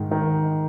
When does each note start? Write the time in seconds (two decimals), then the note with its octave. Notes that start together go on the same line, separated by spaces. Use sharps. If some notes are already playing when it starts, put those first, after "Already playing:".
Already playing: G#2 D#3
0.11 D#3